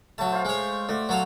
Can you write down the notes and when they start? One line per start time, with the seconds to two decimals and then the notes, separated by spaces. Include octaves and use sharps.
0.18 F#3 A3 A5
0.32 C5 F5
0.45 G#3 C#5
0.89 A3 F#4 D5
1.09 F#3 A4 F5